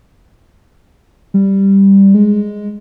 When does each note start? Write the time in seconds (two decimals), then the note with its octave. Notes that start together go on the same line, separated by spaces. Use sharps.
1.34 G3
2.14 G#3